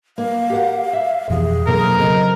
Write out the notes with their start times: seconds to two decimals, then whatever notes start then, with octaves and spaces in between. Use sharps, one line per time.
0.18 A#3 F5
0.50 G4 A#4 F#5
0.93 E5
1.30 F2 B2 E3 G4 G#4
1.67 B2 D3 F#3 A#3 C4 A#4
1.99 C#3 F#3 C4 D#5